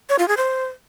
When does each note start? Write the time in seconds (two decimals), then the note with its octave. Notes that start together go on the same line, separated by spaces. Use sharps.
0.10 C#5
0.19 F4
0.28 G#4
0.37 C5